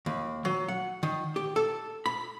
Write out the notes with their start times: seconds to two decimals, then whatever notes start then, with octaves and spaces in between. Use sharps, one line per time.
0.06 D#2
0.45 F#3
0.68 F#5
1.03 D#3
1.36 G4
1.56 A4
2.06 B5